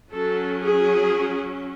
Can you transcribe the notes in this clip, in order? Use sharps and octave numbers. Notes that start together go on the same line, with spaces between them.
F#3 C#4 A4
G#4